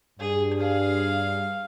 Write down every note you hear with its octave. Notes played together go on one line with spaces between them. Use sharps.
G2 G#4
G#4 F5